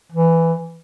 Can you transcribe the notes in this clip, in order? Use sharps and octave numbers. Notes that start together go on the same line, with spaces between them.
E3